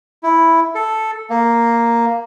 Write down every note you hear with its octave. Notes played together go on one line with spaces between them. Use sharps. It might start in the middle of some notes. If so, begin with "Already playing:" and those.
E4
A4
A#3